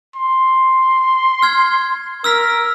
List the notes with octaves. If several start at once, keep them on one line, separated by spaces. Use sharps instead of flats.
C6
F6 G#6
A#4 E6 F6 B6